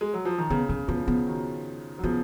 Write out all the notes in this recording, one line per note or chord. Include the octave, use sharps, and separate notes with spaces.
G#3
F#3
F3
D#3
C#3 B3
C#3 A#3
C#3 F3 B3
C#3 B3
B2 D#3
F#3
C#3 F3 B3